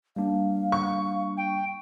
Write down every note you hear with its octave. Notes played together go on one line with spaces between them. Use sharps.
G3 A#3 D4 F5
C#6
G5